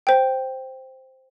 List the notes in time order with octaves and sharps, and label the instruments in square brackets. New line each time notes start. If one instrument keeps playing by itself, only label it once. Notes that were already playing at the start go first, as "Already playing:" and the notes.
[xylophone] C5 G5